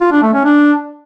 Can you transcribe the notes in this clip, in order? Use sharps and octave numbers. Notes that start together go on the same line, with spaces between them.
F4
D4
A3
C#4
D4